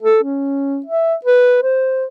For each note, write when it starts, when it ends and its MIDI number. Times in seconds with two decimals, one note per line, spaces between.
0.02 0.20 69
0.23 0.81 61
0.86 1.15 76
1.25 1.60 71
1.63 2.05 72